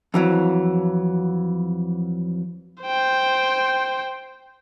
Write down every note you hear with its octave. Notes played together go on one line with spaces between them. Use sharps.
F2 E3 F#3
C5 G5